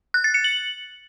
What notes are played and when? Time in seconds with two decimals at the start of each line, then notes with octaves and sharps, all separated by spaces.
0.14 F#6
0.24 A6
0.34 C#7
0.44 F#7